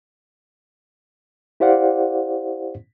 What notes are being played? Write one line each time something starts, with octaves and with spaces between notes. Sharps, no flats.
E4 G4 C5 D5 F5 F#5